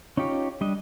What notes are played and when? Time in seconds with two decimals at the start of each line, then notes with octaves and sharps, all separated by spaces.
0.17 C#4 D#4 F4 G4 C#5
0.61 G3 D4 D#5